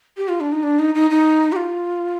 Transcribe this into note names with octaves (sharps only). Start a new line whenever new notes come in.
G4
F4
D4
D#4
D4
D#4
D#4
D#4
G4
F4